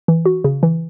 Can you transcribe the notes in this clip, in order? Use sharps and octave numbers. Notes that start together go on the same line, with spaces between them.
E3
F#4
C#3
E3